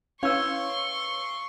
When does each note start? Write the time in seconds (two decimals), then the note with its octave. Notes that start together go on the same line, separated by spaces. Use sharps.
0.23 C#4 E4 B4 C#5 F5 C6 C#6 E6